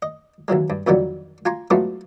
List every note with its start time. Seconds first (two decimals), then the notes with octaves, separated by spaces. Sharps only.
0.02 D#5
0.48 D#2 E3 F#3 G#3
0.70 G2
0.87 F2 A#2 D3 D#3 F#3 G3
1.46 F4 G#5 A#5 C6
1.70 F#3 G#3 A3 B3 E4 F4